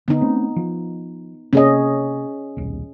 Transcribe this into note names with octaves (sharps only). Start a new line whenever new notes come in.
D3 B3 D#4
A3 C4 C#4
F3
C3 A#3 C#4 G#4 D#5
D#1 B1